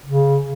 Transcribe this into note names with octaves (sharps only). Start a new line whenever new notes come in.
C#3